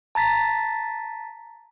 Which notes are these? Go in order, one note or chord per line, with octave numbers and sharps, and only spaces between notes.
A5 A#5 A6 B6